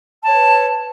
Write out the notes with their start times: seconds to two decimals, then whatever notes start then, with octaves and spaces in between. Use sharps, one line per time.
0.24 A5
0.27 C#5
0.30 B4